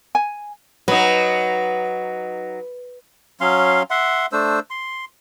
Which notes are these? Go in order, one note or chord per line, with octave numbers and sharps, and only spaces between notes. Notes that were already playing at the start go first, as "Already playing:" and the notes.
G#5
F#3 D#4 B4
F#3 C#4 F5 C6
E5 F#5 C6
A3 D4 C5 E6
C6